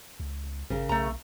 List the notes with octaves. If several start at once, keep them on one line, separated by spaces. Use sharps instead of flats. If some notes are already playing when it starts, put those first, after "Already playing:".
C#2
G#1 C#3 A#4
B1 A3 A#5